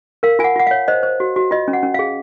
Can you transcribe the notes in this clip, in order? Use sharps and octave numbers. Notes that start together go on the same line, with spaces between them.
A#4 F5
F4 G#5
F#5
F4 F#5
F5
C#5
C5 D#5
C5
F#4
F#4
F4 D#5
C#4
F#5
C#4
F5
G#4